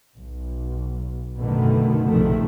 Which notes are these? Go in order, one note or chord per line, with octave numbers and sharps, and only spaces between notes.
B1
F#2 B2 D3 D#3 A3
A#1 C3 D#3 F3 A3